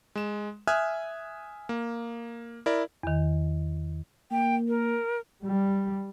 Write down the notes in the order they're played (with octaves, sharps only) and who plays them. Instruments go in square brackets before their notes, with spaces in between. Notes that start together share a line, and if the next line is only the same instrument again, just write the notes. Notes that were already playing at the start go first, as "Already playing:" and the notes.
[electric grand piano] G#3 E7
E5 G#5 D#6 F6 F#6 G#6
A#3
E4 A#4 D5
[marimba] E2 D#3
[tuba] A#3 [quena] G5
[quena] A#4
[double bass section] G3